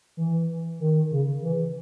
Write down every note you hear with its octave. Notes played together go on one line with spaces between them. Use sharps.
E3
D#3
C#3
E3